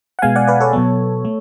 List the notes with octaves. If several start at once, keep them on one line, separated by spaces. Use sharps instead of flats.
F#5
B2 G#3 B3 F5 G#5
D5 F#5
B4 D5
A4 C#5
B2 F#3 B3
A3